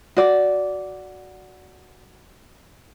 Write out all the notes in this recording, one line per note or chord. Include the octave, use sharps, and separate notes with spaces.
F#4 D5